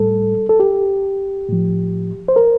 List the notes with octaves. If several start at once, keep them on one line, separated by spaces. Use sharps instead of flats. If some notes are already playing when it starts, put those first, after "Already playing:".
Already playing: A2 G3 A4
A4
G4
A2 F3
C5
A#4